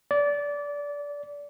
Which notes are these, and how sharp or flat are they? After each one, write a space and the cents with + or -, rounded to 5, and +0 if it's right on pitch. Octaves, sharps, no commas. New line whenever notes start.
D5 -20